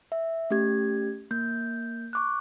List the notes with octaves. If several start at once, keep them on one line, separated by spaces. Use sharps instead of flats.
E5
A3 C#4 G4 G#6
A#3 G6
C#6 D6 F#6